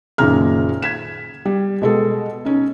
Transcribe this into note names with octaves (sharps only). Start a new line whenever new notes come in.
F#1 A#2 D#3 C#4 A#5 F6
G#6 B6 E7
G3
B2 G#3 A4
C#4 D#4